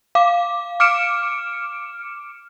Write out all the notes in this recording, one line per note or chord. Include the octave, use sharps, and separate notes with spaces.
F5 D6
D6 F6 C#7 D7 E7